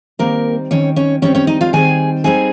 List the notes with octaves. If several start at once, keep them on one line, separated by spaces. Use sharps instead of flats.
D#3 G3 A#3 C4 A#4
D#3 G3 C4 C#4 C#5
C#4 C#5
D#3 G3 C4 C#4 C#5
C#4 C#5
D#4 D#5
F4 F5
D#3 G3 C4 G#4 G#5
G3 C4 D#4 G#4 G#5